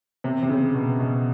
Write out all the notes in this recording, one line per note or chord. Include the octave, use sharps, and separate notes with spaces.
C3
C3
C#3
B2
B2